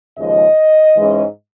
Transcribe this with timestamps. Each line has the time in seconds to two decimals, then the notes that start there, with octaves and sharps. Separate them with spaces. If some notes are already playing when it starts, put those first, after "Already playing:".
0.18 D#2 C#3 F3 G#3 D#5
0.96 G#2 E3 G#3 C#4